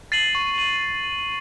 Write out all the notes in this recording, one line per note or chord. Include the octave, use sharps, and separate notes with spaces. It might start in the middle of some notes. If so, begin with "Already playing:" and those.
A6 C7 D#7 F#7
C#6
D#7 F#7